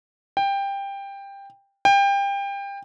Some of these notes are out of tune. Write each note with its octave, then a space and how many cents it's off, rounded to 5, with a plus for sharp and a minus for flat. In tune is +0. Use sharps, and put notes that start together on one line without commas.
G5 +15
G5 +25